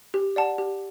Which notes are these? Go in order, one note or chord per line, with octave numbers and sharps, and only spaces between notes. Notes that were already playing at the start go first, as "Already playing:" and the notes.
G4
D5 F#5 A5
G4